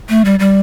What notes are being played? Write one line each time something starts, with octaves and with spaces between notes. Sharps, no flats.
A3
G3
G3